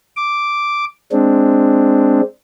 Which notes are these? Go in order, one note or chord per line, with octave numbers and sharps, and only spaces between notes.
D6
G#3 C4 D4